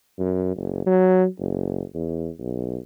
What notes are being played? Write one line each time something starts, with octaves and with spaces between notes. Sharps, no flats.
F#2
F#1
F#3
F#1
E2
B1